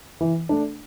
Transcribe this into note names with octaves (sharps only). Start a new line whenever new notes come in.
E3
A3 D4